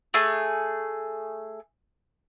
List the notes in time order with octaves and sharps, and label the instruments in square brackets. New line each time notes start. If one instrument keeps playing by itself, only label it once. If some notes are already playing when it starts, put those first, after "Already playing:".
[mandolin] A3 G#4